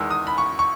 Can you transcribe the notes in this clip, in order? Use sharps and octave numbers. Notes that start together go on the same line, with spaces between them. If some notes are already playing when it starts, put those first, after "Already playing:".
Already playing: E2 D#3 G#3 E6
D#6
B5
C#6
C#6